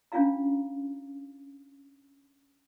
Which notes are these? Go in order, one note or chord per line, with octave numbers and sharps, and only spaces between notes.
C#4 D4 F4 F5 A#5